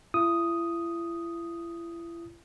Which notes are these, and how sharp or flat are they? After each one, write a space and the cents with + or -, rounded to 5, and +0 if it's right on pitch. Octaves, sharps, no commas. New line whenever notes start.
E4 +40 D#6 +0